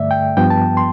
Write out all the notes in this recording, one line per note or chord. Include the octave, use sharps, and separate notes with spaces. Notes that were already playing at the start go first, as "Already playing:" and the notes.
Already playing: G2 D3 A3 D5 E5
G5
G2 F3 B3 G5
A5
C6